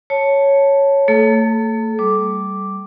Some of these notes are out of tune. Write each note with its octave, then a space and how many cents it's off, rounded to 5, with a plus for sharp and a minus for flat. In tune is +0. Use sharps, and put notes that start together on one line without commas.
C#5 +0 A5 +0
A3 +40 A4 -30
G3 -20 D6 +0